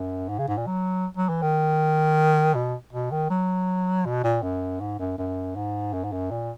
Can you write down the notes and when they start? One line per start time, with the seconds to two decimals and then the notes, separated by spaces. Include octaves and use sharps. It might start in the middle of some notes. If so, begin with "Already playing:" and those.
Already playing: F#2
0.29 G#2
0.39 C#3
0.48 G#2
0.57 A#2
0.67 F#3
1.17 F#3
1.29 E3
1.42 D#3
2.55 B2
2.92 B2
3.11 D#3
3.30 F#3
4.06 B2
4.24 A#2
4.43 F#2
4.80 G#2
4.99 F#2
5.18 F#2
5.56 G#2
5.93 F#2
6.04 G#2
6.12 F#2
6.31 A#2